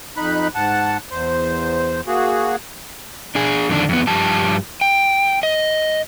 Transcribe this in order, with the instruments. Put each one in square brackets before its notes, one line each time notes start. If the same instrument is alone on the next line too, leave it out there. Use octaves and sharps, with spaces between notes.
[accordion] F2 D#4 B5 F#6
G#2 F#5 A5
E2 C5
A#3 F#4 G#4
[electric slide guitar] D4 G#4
F2 D3 D#3 D4
F2 B3
G2 F3 G4 A5
G5
D#5